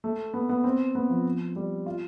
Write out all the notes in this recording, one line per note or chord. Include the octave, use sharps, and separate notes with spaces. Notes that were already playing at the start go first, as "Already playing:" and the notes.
A3
B3
B3
C4
B3
F3
G3
F4